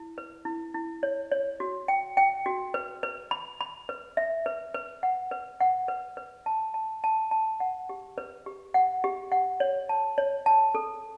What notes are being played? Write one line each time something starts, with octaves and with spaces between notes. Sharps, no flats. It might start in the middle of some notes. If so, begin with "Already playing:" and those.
Already playing: E4
B4
E4
E4
C#5
C#5
F#4
G5
G5
F#4
B4
B4
B5
B5
B4
E5
B4
B4
F#5
B4
F#5
B4
B4
A5
A5
A5
A5
F#5
G4
B4
G4
F#5
G4
F#5
C#5
A5
C#5
A5
A4